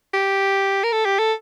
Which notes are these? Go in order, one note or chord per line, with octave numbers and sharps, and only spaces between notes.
G4
A#4
A4
G4
A4